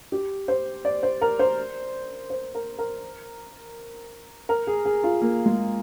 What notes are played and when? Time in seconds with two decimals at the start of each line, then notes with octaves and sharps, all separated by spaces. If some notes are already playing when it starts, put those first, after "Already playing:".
0.12 G4
0.48 C5
0.85 D5
1.03 C5
1.21 A#4
1.39 C5
2.30 C5
2.55 A#4
2.79 A#4
4.49 A#4
4.67 G#4
4.85 G#4
5.04 F4
5.22 A#3
5.46 G#3